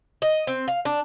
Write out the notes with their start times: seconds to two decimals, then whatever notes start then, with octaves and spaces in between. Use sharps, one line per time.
0.22 D#5
0.47 C4
0.68 F5
0.85 D4